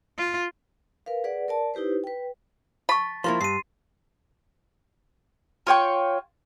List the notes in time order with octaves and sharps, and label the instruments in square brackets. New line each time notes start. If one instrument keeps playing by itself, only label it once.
[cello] F4
[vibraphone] A#4 B4 F5
G#4 B4 D5 F#5
A#4 D5 A5
D#4 E4 G4 B4 C5
B4 G5
[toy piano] A5 C#6 [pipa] B5 [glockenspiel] A6
[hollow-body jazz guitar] F3 A#3 E4 [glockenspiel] C6
[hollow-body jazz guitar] G2 [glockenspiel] C7 D#7
[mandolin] F4 C#5 G5 C#6